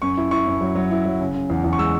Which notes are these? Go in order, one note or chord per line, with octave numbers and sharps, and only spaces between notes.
F#2 C#6
E4
E4 C#6
F#2
F#3
F#3
E4
F#3
C#3
C#3
E2
E2
C#6
G#3 E6